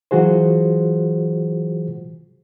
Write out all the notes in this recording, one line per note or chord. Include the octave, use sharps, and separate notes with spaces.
E3 F#3 F4 F#4 G#4 C5